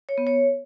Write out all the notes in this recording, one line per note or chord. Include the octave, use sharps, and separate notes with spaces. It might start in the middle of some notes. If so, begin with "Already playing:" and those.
C#5
B3
C#5